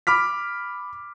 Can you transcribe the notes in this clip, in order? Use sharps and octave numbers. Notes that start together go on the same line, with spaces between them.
B5 D6 F6 B6